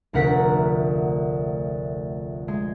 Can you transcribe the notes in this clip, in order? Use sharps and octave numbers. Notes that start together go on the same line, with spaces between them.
F1 D2 A#4 F#5 B6
G#3